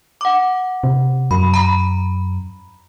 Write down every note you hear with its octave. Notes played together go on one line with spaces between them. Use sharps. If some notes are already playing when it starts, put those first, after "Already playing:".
F#5 D6
C3
F#2 B5
A#5 B5